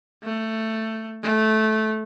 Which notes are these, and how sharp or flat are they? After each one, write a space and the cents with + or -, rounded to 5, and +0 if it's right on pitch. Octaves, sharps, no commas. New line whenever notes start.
A3 +10
A3 -15